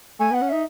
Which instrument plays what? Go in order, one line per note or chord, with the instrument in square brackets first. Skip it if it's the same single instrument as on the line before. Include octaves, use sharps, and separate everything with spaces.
[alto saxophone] A3 [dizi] G#5
[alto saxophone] B3 [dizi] F#5
[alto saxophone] C#4
[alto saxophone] D#4 [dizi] E5